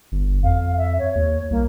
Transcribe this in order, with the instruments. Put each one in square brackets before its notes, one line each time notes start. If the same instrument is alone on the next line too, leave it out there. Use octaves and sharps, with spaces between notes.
[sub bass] G1
[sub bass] F2 [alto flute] F5
[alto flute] E5
C#5
[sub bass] D#2
[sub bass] C2 [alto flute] A#3